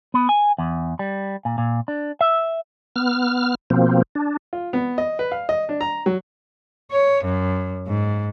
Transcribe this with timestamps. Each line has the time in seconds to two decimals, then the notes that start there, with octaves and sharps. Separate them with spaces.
0.14 B3
0.29 G#5
0.58 E2
0.99 G3
1.45 A#2
1.58 A#2
1.88 D4
2.21 E5
2.96 B3 F6
3.70 B2 F3 A#3 C4
4.15 D4
4.53 F4
4.73 B3
4.98 D#5
5.19 B4
5.32 F5
5.49 D#5
5.69 D4
5.81 A#5
6.06 F#3
6.91 C#5
7.24 F#2
7.87 G#2